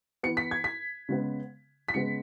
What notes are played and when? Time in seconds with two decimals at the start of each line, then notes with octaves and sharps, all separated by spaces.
0.23 E3 B3 C#7
0.37 B6
0.51 G#6
0.64 B6
1.09 C#3 G#3 B3
1.88 B6
1.94 C#3 G#3 B3 C#7